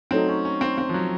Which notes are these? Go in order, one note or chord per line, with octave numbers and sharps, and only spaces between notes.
F#3 A3 C4 D#4
C#4
C#4
C4
C4
F3
F#3